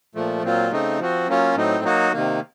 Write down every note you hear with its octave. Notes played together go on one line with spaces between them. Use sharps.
A#2 F3 A3
A#2 F#3 C4 F4
C#3 A3 C4 D#4
F3 C4 F#4
F#3 A#3 C#4 F4
A2 F#3 C4 D#4
F#3 A#3 D#4 F#4
C3 D#3 A#3